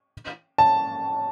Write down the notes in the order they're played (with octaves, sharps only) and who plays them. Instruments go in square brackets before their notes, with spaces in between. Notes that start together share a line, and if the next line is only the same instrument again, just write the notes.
[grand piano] A5